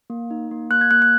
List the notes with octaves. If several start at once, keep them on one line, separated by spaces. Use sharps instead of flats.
A#3
D#4
A#3
A#3 F#6
G#6
A#3 F#6
F#6